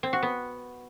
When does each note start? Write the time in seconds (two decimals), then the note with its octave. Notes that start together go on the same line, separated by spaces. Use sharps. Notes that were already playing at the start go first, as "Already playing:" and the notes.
0.03 C4
0.13 F#4
0.23 B3